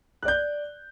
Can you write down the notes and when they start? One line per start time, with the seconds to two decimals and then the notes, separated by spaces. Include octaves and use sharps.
0.23 F#6
0.25 D5
0.28 G6